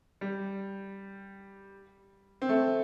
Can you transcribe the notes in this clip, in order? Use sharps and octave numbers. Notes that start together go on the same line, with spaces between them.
G3
C4
A3